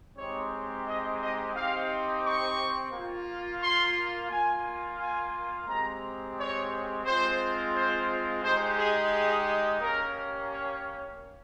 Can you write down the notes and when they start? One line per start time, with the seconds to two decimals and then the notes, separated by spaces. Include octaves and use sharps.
0.17 G#3 C4 D#4 G4 C#5
0.85 D#5
1.20 D#5
1.54 C4 D#4 G4 F5
2.24 C#6
2.92 A#3 F4
3.61 C6
4.30 A#3 F4 G#5
4.98 G#5
5.67 G#3 C4 G4 A#5
6.36 C#5
7.05 G#3 C4 F4 C5
7.74 C5
8.43 G#3 D#4 G4 C5
8.77 G#4
9.12 G#4
9.80 A#3 C#4 G4 A#4
10.50 C#5